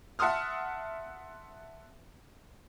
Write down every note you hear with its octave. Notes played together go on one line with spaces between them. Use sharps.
E5 F#5 A5 C6 D#6 F6